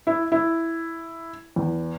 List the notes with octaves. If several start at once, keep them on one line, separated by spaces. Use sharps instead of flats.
E4
E4
E2